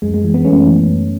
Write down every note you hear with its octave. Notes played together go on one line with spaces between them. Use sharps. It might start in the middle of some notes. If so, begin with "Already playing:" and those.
F#2 G#3
G#3
E3
G#3 B3
F#2 A3 C#4
E3
F#2